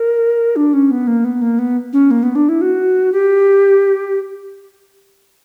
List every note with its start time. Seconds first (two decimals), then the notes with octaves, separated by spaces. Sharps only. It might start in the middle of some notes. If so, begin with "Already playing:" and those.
Already playing: A#4
0.56 D4
0.73 C#4
0.91 B3
1.07 A#3
1.24 B3
1.41 A#3
1.59 B3
1.93 C#4
2.11 A#3
2.23 B3
2.35 D4
2.49 E4
2.61 F#4
3.12 G4